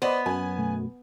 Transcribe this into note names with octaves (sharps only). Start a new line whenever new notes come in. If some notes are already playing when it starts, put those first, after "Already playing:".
B3 C5 D5 D#5
F#2 G#5
B2 A3